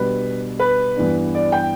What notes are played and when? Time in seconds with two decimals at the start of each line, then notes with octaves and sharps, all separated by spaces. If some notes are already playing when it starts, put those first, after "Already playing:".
Already playing: B2 G3 D4 B4
0.59 B4
0.96 G2 E3 B3 D4
1.35 D5
1.52 G5